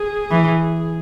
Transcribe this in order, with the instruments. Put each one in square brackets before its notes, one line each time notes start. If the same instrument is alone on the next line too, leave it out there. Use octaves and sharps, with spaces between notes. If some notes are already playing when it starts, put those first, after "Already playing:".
Already playing: [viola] G#4
[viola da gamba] E3